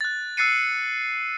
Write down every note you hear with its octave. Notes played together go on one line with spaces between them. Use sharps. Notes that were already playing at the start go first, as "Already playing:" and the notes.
F#6 A6
E6 F#6 A6 C7 C#7 D#7